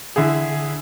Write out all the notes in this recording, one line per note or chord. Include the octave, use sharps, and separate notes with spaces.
D3 E4 G#4